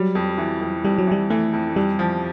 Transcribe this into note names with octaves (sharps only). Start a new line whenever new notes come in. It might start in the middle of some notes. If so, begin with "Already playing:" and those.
Already playing: F#3 G3
F2
E3
F2
F2 G3
F#3
E3 G3
E3 A3
F2
F2 G3
F3